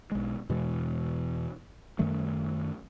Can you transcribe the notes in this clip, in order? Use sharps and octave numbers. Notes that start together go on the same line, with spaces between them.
B1 G#3
E2 B2 E3 G#3
F#2 D#3 G3 A3